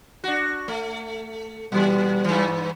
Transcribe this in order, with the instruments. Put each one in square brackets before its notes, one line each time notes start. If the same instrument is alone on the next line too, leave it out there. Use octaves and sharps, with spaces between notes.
[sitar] D4 F#4
A3
[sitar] A#2 E3 [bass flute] G3
[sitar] G2 E3